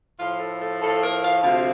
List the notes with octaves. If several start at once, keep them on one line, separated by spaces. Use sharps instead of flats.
A2 F3 F4
A4
A4
A2 F3 A4
A#4
F5
D2 C3 F3 F5